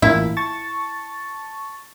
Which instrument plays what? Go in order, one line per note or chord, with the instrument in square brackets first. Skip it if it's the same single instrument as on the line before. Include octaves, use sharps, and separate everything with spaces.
[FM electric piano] A1 A#3 F4 [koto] E4
[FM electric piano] A5 C#6 A6